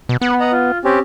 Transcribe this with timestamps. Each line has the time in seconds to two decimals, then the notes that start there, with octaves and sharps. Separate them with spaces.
0.09 B2
0.21 B3 F#5
0.40 D#5 F#5 A#5
0.52 F4
0.84 C4 C#4 G4